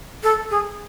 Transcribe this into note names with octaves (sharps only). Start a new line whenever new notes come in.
A4
G#4